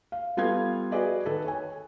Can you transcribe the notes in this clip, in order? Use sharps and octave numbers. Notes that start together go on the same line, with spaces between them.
F5
G3 B3 F4 A4 F5 G#6
F#4 G#4 B4 D5 D#5
D#3 A4 B4
C#5 G#5